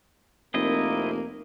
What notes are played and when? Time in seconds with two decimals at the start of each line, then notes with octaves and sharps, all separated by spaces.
0.54 F1 A#3 C4 E4 D#5